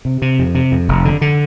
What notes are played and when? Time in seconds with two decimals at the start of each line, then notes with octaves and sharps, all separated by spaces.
0.05 C3
0.22 C3
0.39 F2
0.55 C3
0.72 F2
0.89 F1
1.05 D3
1.21 D3